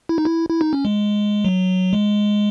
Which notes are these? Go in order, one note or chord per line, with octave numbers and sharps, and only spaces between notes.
E4
D#4
E4
E4
D#4
C#4
G#3
F#3
G#3